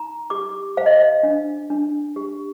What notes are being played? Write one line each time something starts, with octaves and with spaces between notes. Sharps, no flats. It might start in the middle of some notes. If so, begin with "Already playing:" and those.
Already playing: D#4 A#5
G4 D6
C5 F5
D#5
F5
D4
D4
G4